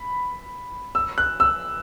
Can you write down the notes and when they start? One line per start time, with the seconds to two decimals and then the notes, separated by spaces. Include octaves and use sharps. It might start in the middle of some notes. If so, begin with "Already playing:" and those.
Already playing: B5
0.95 E6
1.18 F#6
1.40 E6